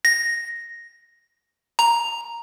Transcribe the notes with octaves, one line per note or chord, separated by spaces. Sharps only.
A#6
A#5